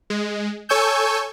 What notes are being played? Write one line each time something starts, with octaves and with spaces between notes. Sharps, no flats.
G#3
A4 C#5 G#5 C#6 E6 G6